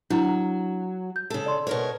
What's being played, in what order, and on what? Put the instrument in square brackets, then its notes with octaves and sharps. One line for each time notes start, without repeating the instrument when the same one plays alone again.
[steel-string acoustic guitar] F#3 [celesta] D4 E4 A#5
[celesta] G6
[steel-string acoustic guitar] C#3 A4
[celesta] D5 C6
[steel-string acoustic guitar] B2 A#4 C#5